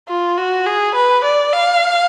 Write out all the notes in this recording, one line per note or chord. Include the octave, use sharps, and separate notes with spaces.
F4
F#4
G#4
B4
D5
F5